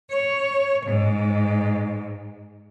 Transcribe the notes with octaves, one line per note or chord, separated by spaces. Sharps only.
C#5
G#2